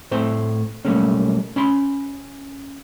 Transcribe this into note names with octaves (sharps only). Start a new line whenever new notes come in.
A2 A3 C4 C5
B1 F#2 G3 A3 A#3 C#4
C#4 B5 C6